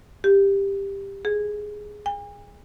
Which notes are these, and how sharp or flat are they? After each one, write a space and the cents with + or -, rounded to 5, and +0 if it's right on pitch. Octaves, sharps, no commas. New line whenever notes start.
G4 +10
G#4 +5
G#5 -45